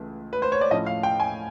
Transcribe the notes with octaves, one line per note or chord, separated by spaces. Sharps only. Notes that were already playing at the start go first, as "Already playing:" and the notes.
Already playing: C#2 C#3 E3 A3
B4
C5
C#5
D5
A2 F3 A3 C#4 D#5
F5
G5
G#5